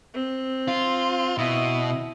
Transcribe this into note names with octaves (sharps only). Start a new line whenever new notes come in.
C4
F4
B2 E4 D#6